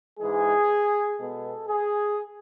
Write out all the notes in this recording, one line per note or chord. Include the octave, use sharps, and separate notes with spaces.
G#2 E3 G#3 G#4
B2 G#3 B3 A4
G#4